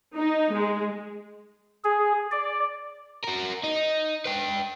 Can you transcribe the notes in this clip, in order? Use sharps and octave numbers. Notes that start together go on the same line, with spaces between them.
D#4
G#3
G#4
D5
F#4 A#4
D#4
B4 G5